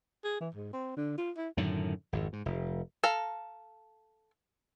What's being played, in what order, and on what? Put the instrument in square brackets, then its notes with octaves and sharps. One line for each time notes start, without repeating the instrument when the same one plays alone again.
[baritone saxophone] G#4
E3
G#2
C4
D3
F4
E4
[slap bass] F#2 A2 D3 D#3
G#1 F2
G#2
F1
[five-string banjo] A4 F5 A#5